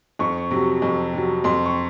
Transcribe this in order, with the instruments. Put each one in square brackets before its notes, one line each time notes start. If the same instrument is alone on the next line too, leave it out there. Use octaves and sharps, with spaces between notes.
[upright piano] F2 C#6
C3 F#3
F2
C3 F#3
F2 C6
C#6